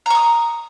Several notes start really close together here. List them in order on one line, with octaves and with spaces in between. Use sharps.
A#5 C#6 D#6